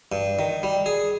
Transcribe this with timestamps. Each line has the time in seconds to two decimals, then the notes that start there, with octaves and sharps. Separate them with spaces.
0.12 G2
0.39 D#3
0.63 G3
0.86 G#4